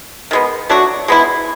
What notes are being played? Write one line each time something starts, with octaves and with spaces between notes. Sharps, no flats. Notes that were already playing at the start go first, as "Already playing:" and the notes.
D#3 G#3 B3
F#3 A3 D4 F#4
G#3 B3 E4